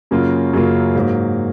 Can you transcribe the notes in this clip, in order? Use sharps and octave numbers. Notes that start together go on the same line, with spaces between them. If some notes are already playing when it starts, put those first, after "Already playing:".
F#2 C#3 F#3 A#3 F4
F#2 C#3 F#3 A#3 F4
G#2 F#3 A#3